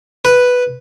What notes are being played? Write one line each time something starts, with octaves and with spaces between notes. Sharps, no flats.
B4